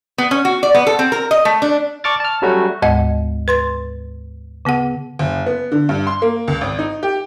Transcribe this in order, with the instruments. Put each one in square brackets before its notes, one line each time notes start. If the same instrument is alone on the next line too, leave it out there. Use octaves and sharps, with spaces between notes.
[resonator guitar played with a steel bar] B3
C#4
F#4
D5
B3
A4
C4
A#4
D#5
A3
D4
[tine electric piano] D5 A5 C#6 D6 F6 A6
A5 F6
F#3 G3 A3 C#4 F#4
[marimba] D2 G#2 G#3 D#5 F#5
B4 C6 A6
C#3 B3 G#4 F#5
[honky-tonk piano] F#1
B3
D3
G2
C6
A#3
C#2
G#1
D#4
G4